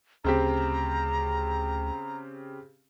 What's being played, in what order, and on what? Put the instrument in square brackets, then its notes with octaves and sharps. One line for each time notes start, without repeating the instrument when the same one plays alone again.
[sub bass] D2 [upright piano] C#3 C4 G4 [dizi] A#5